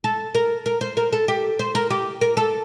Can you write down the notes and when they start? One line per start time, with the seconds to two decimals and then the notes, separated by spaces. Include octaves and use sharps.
0.04 A4
0.35 A#4
0.66 A#4
0.81 C5
0.97 A#4
1.13 A4
1.28 G4
1.59 C5
1.75 A#4
1.90 G4
2.21 A#4
2.37 A4